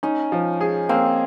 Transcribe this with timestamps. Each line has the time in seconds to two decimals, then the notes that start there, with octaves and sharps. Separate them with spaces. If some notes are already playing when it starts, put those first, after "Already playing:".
0.03 C#4 D#4
0.32 F3
0.61 G#4
0.89 A#3 C4